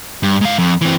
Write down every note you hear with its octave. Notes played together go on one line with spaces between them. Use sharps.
G2
G#2 F5
F2
E3 C4